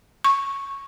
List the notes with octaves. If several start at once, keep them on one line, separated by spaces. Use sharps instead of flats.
C#6